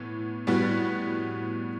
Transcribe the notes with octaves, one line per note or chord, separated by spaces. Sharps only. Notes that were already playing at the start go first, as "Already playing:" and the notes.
Already playing: A2 E3 B3
A2 G3 B3 F#4